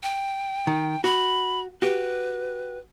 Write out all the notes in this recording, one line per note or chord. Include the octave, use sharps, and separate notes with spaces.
G5
D#3
F#4 B5
F#4 G4 B4